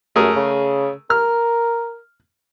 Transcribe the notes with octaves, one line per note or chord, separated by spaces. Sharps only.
F#2 A3 G#4 A#4
C#3
A#4 F6